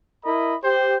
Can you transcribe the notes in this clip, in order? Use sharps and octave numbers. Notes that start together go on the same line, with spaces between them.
E4 A#4 D#5 B5
G4 C5